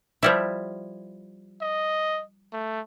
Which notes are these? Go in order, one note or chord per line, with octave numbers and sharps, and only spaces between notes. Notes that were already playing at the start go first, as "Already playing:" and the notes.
F3 G3 E4
D#5
A3